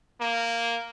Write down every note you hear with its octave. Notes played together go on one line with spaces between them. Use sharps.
A#3